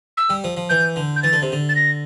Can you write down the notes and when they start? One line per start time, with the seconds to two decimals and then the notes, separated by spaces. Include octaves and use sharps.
0.17 E6
0.30 G3
0.44 F3
0.57 F3
0.69 E3 G6
0.96 D3
1.16 G6
1.23 E3 A6
1.33 D3
1.42 C3
1.52 D3
1.69 A6
1.75 A#6